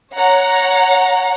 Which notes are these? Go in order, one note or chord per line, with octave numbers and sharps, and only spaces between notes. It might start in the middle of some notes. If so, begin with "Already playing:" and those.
C#5 F#5 A#5